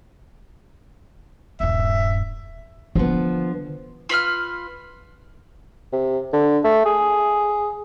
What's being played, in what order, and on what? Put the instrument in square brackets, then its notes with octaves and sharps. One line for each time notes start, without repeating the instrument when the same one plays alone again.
[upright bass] D#1 G2 [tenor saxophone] E5
[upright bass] D3 [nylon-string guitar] F3 B3
[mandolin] F4 B4 E6 F6
[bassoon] C3
D3
A3
G#4